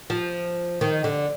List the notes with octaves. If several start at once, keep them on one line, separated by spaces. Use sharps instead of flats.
F3
D#3
D3